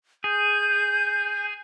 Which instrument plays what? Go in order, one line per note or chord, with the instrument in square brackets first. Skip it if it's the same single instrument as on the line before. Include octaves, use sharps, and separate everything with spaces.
[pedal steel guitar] G#4 [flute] G6